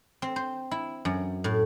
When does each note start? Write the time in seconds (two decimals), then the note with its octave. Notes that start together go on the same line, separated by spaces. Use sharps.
0.22 C4
0.36 C5
0.71 E4
1.05 F#2
1.44 A2